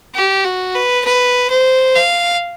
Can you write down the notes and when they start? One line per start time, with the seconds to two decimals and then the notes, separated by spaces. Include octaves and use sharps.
0.15 G4
0.44 F#4
0.74 B4
1.05 B4
1.50 C5
1.95 F5